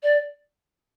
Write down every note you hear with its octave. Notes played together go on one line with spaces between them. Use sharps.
D5